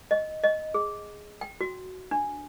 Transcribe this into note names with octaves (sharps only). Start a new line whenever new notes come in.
D#5
D#5
G#4
G5
F#4
D4